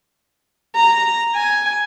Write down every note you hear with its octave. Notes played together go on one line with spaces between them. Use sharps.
A#5
G#5